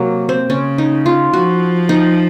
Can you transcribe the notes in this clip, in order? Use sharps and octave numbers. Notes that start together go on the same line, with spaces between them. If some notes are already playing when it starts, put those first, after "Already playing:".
Already playing: C3 F#3 A#3
C4
C#3 C#4
D#4
F4
F3 F#4
D#4